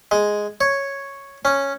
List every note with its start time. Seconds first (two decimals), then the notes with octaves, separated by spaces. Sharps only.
0.11 G#3
0.61 C#5
1.45 C#4